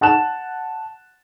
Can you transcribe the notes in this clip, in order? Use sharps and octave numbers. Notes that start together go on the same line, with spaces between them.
F#5 A5 F#6 E7